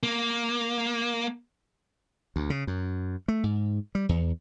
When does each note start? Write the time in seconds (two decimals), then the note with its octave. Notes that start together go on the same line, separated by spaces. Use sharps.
0.03 A#3
2.36 D2
2.50 C#3
2.67 F#2
3.28 A3
3.43 G#2
3.95 G3
4.09 E2